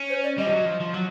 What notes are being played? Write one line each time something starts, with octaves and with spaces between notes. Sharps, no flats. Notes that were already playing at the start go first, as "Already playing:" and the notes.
Already playing: C#4
C5
D5
G3 D#5
F3
F#3
F3
F3
F#3